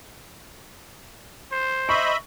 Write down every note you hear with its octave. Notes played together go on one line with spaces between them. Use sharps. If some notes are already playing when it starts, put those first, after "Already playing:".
C5
D#5 E5 B5 C#6